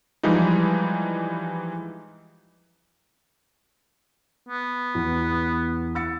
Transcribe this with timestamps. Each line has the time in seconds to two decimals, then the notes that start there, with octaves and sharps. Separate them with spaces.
0.23 E3 F3 G3 G#3 D#4
4.49 B3
4.95 E2
5.95 E6 A6 C#7